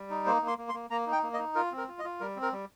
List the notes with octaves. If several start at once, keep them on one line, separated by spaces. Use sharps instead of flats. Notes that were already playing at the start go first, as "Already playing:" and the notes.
Already playing: G3
D#4
A#3 C5
A#3
C6
A#3
C6
A#3
A#3 A#5
D#4
G5
A#3
D#5
D#4
F4 A#4
C4
A#4
F4
D#5
F4
G3 A#4
C4
A#4
G3